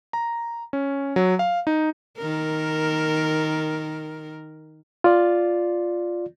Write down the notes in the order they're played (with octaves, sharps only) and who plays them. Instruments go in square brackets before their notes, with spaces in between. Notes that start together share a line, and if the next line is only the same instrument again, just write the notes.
[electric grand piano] A#5
C#4
F#3
F5
D#4
[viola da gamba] D#3 A#4
[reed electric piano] F4 D5